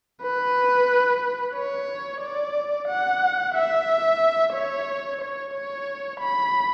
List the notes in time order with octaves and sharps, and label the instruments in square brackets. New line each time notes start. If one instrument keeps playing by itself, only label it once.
[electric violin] B4
C#5
D5
F#5
E5
C#5
C#5
C#5
B5